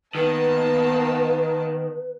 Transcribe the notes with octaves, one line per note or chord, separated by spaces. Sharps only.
D#3 A#3 B3 B4 A5